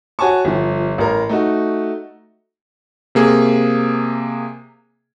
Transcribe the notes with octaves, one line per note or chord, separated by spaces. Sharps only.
F#4 C#5 G#5 A5 C#6
G1 F3
A1 A#4 A#5
A3 D#4 F#4
C3 A#3 G#4